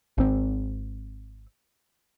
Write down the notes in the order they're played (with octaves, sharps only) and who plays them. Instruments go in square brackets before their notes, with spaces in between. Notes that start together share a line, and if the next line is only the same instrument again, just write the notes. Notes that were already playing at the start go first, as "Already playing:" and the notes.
[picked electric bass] G#1 C4